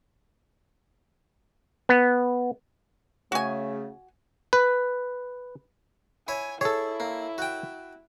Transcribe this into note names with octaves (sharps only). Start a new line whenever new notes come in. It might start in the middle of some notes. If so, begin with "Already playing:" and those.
B3
C#3 A3 F#4 G#5
B4
E4 C#5 G#5
E4 G#4 A4 C#5
A#3
F#4 G5